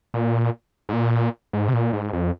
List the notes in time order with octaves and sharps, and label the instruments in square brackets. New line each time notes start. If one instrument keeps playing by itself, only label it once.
[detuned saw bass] A#2
G#2
A#2
G#2
C3
A#2
G#2
F2